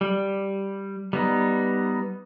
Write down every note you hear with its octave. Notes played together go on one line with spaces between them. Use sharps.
G3
G3 B3 D#4